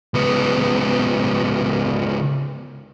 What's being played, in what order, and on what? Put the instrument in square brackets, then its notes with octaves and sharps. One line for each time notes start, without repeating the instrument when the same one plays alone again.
[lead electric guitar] C#2 B3